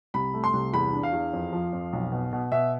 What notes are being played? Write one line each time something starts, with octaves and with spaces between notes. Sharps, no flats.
C2 B5
A3
C6
C2
E2 B5
D4
F5
E2
F2
F3
F2
B1
B2
B2
B2 E5